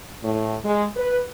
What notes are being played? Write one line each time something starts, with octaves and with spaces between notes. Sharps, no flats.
A2
G#3
B4